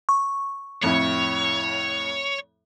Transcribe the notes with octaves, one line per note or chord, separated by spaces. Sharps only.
C#6
F2 A2 E4 C#5